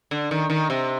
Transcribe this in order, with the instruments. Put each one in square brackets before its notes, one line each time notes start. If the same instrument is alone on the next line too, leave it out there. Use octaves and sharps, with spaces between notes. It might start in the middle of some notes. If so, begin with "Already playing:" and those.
[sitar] D3
D#3
D#3
C3